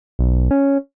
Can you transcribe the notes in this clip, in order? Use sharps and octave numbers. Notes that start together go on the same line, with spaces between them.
B1
C#4